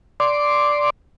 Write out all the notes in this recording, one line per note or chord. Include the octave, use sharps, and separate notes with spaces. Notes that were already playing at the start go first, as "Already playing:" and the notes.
D5 C6 D6